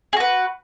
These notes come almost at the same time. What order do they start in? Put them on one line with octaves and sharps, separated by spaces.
G#4 F#4 B4